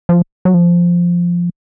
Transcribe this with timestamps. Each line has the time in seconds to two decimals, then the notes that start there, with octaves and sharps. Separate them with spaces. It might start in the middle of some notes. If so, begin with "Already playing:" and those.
0.09 F3
0.45 F#3
0.54 F3